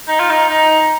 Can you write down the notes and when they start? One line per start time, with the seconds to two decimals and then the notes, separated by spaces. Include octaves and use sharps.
0.08 D#4
0.20 F4
0.31 D#4
0.49 D#4